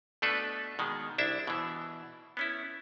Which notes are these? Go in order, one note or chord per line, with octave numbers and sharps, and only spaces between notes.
B2 A3 D4 A4 B4
B2 D#3 G#3
C2 D4 E4 E5
B2 E3
B3 C#4 E4